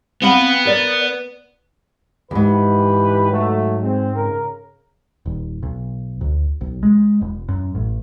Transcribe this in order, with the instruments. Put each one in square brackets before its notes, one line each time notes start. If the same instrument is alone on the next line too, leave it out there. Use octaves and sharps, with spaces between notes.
[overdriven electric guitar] B3 B5 [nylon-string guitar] C4 F5 F#5
[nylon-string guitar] A#4 D5
[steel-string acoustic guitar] F2 G#2 [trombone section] E3 G4 B4
[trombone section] F#3 A3
G#3 C4
C#3 A#4
[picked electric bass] D#1
B1
D2
B1
G#3
E1
F#2
A1